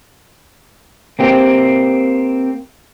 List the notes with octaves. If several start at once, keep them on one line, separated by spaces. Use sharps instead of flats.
A#3 C4 G4